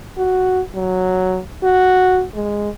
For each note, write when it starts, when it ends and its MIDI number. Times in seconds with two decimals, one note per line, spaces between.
0.18 0.61 66
0.75 1.39 54
1.63 2.24 66
2.35 2.69 56